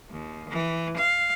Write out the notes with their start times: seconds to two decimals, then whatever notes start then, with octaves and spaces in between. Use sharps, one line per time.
0.11 D#2
0.49 E3
0.97 F5